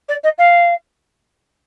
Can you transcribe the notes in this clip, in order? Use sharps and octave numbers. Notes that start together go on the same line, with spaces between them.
D5
D#5
F5